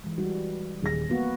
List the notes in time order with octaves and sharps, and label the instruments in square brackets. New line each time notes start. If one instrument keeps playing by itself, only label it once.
[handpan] E3 G#3
[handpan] G3 [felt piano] F#4
[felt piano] D#1 G#4 A#6
[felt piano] A#3 [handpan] B3 F#4